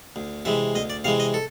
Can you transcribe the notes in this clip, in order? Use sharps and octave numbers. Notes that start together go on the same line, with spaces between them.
D2
C3 E3 G#3 E5
D2 D#5
D5
C3 E3 G#3 F5
D#5
A4